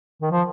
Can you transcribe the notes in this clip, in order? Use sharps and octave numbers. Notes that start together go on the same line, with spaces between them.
D#3
F3